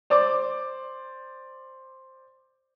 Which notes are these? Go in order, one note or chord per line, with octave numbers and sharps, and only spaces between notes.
C5 D5 D6